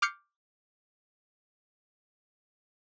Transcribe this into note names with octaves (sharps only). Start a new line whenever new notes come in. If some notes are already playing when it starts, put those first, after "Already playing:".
D6 F6 G6 C7 C#7